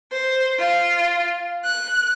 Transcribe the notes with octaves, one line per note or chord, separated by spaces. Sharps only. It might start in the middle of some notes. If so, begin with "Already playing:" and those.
C5
F4
F#6